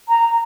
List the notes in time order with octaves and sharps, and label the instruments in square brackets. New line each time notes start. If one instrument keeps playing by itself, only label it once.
[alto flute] A#5